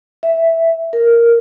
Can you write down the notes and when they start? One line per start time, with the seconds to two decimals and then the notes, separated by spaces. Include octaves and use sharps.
0.23 E5
0.93 A#4